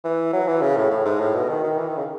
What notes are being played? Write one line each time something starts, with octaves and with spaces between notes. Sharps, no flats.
E3
F#3
E3
C#3
A2
A2
G#2
A2
B2
D#3
D#3
E3
D#3
C#3